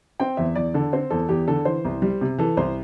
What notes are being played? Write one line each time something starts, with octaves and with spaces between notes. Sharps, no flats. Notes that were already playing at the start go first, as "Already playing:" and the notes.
C4 G5
E2 E5
E2 D5
D3 A4
C4 C5
E2 A4
E2 G4
D3 A4
E3 C5
C2
G3
C3
E3 A4
C2 C5